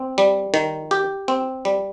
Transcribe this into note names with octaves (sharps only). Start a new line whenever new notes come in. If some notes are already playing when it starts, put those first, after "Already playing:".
Already playing: C4
G3
D#3
G4
C4
G3